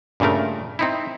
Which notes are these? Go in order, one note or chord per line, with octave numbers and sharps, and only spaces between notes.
G2 A#2 C#3 A3 A#4
C4 D#4 E4